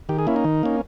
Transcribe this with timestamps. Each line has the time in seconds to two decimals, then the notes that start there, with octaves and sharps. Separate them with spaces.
0.09 D#3 G4
0.18 G#4
0.27 A#3 C#4 E4
0.36 D#4
0.44 D#3
0.63 A#3 C#4